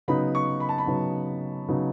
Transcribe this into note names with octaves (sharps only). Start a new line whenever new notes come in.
C#3 F#3 B3 D#4 B5
C#6
B5
A5
B5
C#3 F#3 B3 D#4
C#3 F#3 B3 D#4